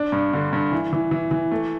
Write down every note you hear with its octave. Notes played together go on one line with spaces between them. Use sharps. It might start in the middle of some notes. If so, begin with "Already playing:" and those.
Already playing: D4
G2
D3
G2
E3
E3
E3
E3
A3